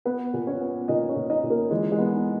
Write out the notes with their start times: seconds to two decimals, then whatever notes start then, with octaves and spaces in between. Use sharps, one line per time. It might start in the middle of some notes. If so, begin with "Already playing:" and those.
0.05 B3 B4
0.33 A#2
0.47 C#4 C#5
0.61 B3
0.88 A#2 D#4 D#5
1.09 C#4 C#5
1.16 A#2
1.30 D#4 D#5
1.43 A#2
1.50 A#3 A#4
1.71 E3 G#3 G#4
1.92 G#3 G#4
1.98 B3
2.13 D#4